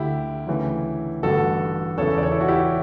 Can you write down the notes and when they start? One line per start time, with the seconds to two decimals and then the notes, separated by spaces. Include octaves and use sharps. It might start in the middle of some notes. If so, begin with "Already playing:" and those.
Already playing: D2 D3 E4 G4
0.47 D2 C#3 E3
1.23 A1 G2 D3 F#4 A4
1.98 E1 E2 C#3 E3 A4 C#5
2.17 D5
2.23 A4 C#5
2.32 E4
2.40 F#4
2.48 E4 G4